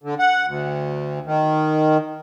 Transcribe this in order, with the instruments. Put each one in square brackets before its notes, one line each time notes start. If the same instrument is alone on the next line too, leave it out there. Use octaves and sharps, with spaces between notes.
[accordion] D3
F#5
D2
D#3